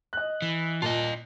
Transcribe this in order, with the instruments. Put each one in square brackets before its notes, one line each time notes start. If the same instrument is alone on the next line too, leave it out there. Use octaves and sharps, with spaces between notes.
[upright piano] D#5 F#6
[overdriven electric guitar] E3
[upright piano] A#2 A5 [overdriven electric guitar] F4 D#5